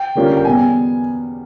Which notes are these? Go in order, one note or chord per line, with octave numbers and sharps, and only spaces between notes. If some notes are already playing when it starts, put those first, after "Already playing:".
Already playing: G5
D3 G3 A#3 C#4 F4
G5
E2 B2 G3 B3 G#5